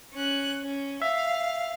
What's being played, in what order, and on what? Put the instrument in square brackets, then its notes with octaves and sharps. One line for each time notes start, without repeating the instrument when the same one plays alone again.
[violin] C#4 F#6
C#4
[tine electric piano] E5 [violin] F5